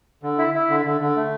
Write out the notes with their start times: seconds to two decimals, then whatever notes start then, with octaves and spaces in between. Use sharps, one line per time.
0.23 D3
0.38 E4
0.55 E4
0.70 D3
0.86 D3
1.01 D3
1.16 A3